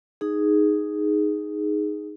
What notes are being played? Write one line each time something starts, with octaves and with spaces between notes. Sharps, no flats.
D#4 G#4